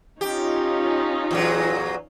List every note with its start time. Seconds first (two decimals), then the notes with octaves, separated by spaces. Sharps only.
0.21 C#4 D#4 F4 G4
1.31 E2 A#2 F#3